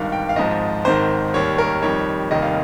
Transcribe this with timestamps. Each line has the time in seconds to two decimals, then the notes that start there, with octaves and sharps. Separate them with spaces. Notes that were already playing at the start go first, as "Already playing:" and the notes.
Already playing: G#1 G2 D#3 F5
0.12 G5
0.29 F5
0.36 G#1 G#2 F3 D#5
0.85 G#1 G#2 D#3 C5
1.34 D#2 D#3 G3 C#5
1.58 A#4
1.82 F2 D#3 G3 C#5
2.31 F1 D#2 D#3 G3 D#5
2.42 F5